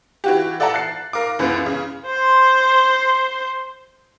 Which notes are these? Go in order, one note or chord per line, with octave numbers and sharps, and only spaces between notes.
E3 F#4 G4
A4 D5 E5 F#5 A5 A#5
F#6 A6 C7
A#4 F5 D6
C#2 F#2 E3 B3
C#3
C5 C6